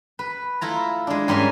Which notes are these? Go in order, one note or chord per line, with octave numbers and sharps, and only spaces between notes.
B4
A3 E4 F4 A#5
G#3 D4
G#2 G3 C#4 A#4 G#5 C6